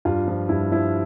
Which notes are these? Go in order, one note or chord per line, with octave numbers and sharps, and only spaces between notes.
G2 F4
F3
G2 E4
F3 E4